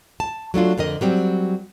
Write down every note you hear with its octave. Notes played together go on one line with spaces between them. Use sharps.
A5
F#3 A3 D4 F4
F2 D3 A#4 D#5
F#3 G3 C4